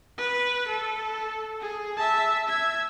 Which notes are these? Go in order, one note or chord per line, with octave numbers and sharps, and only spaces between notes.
B4
A4
G#4
E5 A5
E5 G#6